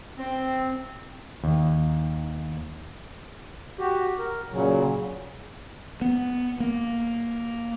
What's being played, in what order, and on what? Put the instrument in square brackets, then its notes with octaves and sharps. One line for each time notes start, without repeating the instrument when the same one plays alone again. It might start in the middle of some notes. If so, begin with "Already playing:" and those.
[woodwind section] C4
[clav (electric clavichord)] D#2
[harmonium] F#4 G4
A#4
A#2 C#3 F#3
[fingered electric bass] B3
A#3